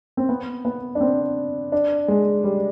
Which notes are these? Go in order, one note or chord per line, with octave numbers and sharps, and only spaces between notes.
C4
B3
B3
D4
C4
D4
G#3
G3